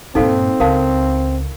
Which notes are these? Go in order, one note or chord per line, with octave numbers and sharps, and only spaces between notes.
G2 A#2 C4 D#4 A4 F5
C#2 A#4 F5 A5